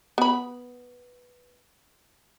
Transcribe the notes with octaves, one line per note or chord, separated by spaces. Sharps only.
B3 B5